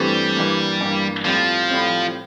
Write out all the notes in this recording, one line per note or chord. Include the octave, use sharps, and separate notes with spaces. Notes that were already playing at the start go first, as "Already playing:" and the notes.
Already playing: G2 E3 G3 A3 C4
G2 E3 A#3
G2 E3 A#3
A2 F3 G3 C4
A2 G3 C4